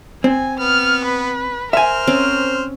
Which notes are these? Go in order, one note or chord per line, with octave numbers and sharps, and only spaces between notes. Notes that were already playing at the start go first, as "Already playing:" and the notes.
C4 G#5
B3 F6
B4
A#4 C5 E5 G#5 F6
C4 C#4